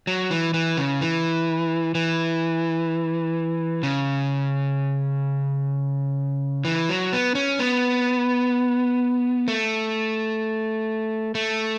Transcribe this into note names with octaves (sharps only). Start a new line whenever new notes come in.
F#3
E3
E3
C#3
E3
E3
C#3
E3
F#3
B3
C#4
B3
A3
A3